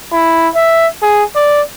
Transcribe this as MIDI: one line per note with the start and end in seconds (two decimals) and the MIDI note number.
0.13 0.48 64
0.55 0.87 76
1.03 1.24 68
1.36 1.61 74